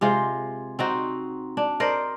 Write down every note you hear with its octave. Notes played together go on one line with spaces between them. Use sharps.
C3 G#3 F4 C5
C4 D#4 F#4
D4
A#4 C5 D5 D#5